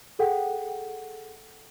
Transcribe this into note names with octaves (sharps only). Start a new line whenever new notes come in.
G#4 A4 F#5 G5